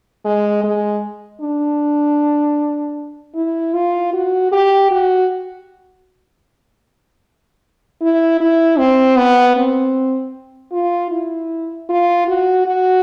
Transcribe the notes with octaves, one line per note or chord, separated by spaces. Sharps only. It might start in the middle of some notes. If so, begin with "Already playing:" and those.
G#3
G#3
D4
E4
F4
F#4
G4
F#4
E4
E4
C4
B3
C4
F4
E4
F4
F#4
F#4